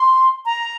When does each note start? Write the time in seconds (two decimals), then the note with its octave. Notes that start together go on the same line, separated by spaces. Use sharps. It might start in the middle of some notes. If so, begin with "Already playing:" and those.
Already playing: C6
0.46 A#5